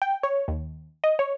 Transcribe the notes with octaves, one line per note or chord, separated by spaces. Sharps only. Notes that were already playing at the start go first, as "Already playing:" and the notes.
G5
C#5
D#2
D#5
C#5